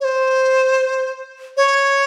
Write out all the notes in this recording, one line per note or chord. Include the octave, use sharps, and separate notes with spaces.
C#5
C5
C#5